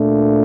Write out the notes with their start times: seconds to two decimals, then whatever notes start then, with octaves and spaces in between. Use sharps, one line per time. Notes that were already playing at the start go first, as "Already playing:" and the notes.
Already playing: A#2 A3 D4